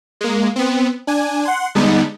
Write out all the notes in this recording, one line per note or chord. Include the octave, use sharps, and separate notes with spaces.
G#3 A#3
B3 C4
D4 G#5
F#5 C6
D3 G3 G#3 B3 D#4